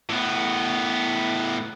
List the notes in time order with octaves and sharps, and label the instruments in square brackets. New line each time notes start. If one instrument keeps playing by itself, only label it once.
[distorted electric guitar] A2 B3